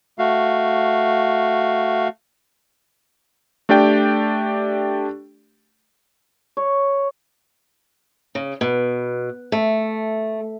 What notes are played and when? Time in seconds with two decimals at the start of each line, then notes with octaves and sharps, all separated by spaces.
0.19 A3 F#4 F5
3.69 A3 D4 G4 D5 G5
6.57 C#5
8.35 C#3
8.61 B2
9.52 A3